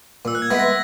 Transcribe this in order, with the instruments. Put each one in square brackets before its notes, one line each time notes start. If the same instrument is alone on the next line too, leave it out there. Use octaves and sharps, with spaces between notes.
[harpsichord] A#2 [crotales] E6
[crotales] F#6
G#6
[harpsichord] G#3 B3 E4 [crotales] B6
[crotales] A#6